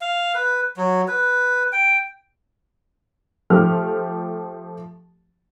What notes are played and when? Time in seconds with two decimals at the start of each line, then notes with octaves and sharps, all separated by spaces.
0.01 F5
0.35 B4
0.77 F#3
1.08 B4
1.72 G5
3.50 F3 A3 G4 F6